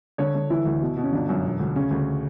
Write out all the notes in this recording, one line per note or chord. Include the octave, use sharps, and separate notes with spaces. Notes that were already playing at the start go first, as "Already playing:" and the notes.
D3 C#5
D3
E3 E4
D2
B2
B2
C#4
G1 D4
F#2
E1
D2
C#3 C#4
D2